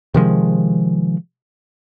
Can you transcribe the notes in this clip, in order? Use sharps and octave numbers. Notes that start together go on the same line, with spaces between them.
C3 D#3 F3 G#3